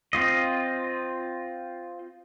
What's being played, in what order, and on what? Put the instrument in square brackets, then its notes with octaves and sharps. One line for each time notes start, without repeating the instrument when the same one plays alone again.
[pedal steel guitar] C4 F4 D#5